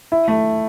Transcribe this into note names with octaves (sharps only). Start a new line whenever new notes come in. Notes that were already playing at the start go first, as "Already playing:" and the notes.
E4
A3